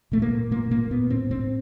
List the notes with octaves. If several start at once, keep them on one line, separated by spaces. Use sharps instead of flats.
A#2 A3
A#3
A#2
A#2 A#3
A#2 A#3
A#2 B3
A2 C4
A2 C4